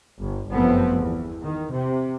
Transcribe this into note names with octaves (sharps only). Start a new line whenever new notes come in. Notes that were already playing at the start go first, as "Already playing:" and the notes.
G1
G1 F#2 F3 A3 B3 C4
E2
D#3
C3